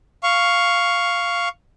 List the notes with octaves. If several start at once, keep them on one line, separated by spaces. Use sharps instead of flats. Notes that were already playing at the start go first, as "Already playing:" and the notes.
F5 C#6